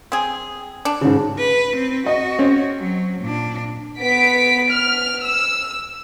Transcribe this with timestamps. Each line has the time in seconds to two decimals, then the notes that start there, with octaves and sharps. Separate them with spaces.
0.12 C4 G#4
0.85 D4
1.01 G#2 C#3
1.38 B4
1.76 C4
2.06 F#4 D#5
2.39 C4 C#4
2.78 F#3
3.21 A#2 D4
4.00 B3 B6 D7
4.69 F6
5.23 E6